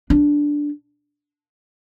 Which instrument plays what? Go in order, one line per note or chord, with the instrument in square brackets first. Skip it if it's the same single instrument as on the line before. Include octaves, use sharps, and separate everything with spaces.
[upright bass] D4